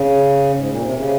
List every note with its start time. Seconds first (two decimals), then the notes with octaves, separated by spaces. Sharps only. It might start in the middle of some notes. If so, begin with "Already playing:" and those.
Already playing: C#3
0.56 G#2
0.69 A#2
0.82 C3
0.94 C#3